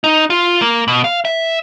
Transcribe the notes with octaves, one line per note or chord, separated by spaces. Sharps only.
D#4
F4
A#3
B2
F5
E5